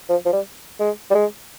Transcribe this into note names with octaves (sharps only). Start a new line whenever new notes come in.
F3
F3
G3
G#3
G3
G#3